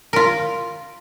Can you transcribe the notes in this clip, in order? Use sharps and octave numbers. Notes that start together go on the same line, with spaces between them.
F4 A#4